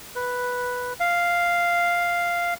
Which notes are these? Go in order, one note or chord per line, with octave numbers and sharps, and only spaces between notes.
B4
F5